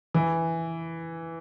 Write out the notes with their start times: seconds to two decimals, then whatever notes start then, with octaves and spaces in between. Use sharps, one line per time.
0.14 E3